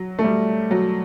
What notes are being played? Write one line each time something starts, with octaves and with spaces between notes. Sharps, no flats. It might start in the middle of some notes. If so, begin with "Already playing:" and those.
Already playing: F#3
A3
G3
F#3